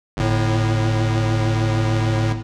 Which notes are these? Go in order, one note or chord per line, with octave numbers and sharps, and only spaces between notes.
G1 A2